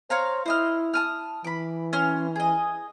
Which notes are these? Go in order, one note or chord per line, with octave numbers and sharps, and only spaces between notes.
C5 C#5 F5 A#5
E4 C5 D#5 F6
A5 D#6 F6
E3 B5 D6
C#4 C6 F6
G#4 D#5